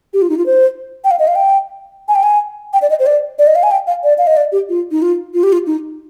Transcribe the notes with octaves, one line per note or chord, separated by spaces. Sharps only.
G4
F4
D#4
F4
C5
G5
F5
D#5
F5
G5
G#5
G5
G#5
G5
D5
D#5
C5
D5
D5
D#5
F5
G#5
G5
F5
D5
F5
D#5
D5
G4
F4
D#4
F4
F4
G4
F4
D#4